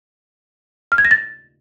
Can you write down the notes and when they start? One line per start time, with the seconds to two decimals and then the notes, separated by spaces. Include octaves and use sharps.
0.92 F6
0.98 G#6
1.05 A#6
1.11 A6